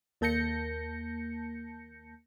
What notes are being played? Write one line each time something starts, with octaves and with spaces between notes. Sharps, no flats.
D#2 A#3 A5 G6 A#6 C#7